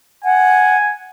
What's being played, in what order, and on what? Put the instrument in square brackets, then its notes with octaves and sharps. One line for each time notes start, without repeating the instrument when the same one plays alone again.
[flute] F#5 [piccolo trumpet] G#5